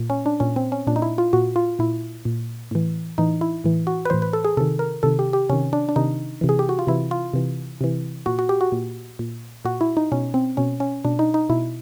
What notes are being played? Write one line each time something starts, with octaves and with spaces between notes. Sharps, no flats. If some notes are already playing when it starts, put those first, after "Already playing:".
Already playing: A#2
C#4
D4
A#2 C#4
C4
C#4
A#2 D4
D#4
E4
F4
A#2 F#4
F4
A#2 E4
A#2
A2 E3
A2 E3 D#4
E4
A2 E3
F#4
B4
A2 E3 C5
B4
A4
G#4
C3 D#3 A4
A#4
C3 D#3 A4
G4
G4
C3 D#3 C#4
D4
D4
C3 D#3 D#4
C3 E3
G#4
G4
F#4
F4
C3 E3 E4
F4
C3 E3
C3 E3
A#2 F#4
F#4
G4
F#4
A#2
A#2
A#2 F#4
E4
D#4
B2 C#4
C4
B2 C#4
C#4
B2 D4
D#4
D#4
B2 E4